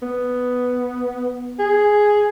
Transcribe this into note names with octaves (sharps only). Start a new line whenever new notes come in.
B3
G#4